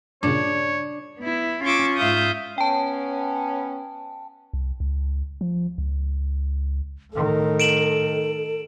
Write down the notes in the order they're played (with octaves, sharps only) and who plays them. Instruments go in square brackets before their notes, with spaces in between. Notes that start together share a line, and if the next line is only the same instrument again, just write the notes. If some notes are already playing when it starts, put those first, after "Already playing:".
[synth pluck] G2 A#2 C#3 [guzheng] D4 [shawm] C#5
[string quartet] B3 E4
C#4 F4 C#6 D6 E6
G#2 F4 E5 F5 D#6 G6
[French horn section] B3 C#4 [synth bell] G5 A5
[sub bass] C2
C#2
F3
C#2
[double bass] A2 D#3 [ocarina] A4
[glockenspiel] D7 E7 F#7